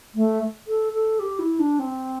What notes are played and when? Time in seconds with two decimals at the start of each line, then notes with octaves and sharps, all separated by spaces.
0.15 A3
0.67 A4
0.93 A4
1.19 G4
1.39 E4
1.59 D4
1.79 C4